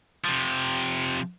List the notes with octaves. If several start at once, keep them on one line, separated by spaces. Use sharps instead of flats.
C3 F3